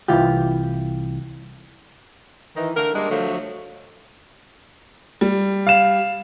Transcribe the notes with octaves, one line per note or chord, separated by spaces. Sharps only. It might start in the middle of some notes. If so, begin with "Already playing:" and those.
C2 E3 F4 G4
D#3 E3
D3 A3 A#4
G3 G#3 A#3 D4
D3 F3 F#3 A3
G3
F5 E7